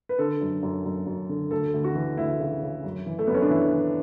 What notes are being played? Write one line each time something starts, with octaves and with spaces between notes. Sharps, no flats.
B4
D3 A4
F#2
F#2
F#2
F#2
D3
D2 A4
D2
F#4
E3
D2 E4
C#3
C#3
F#2
E3
A3
F#2 B3
C#4
D4
E3 E4
E3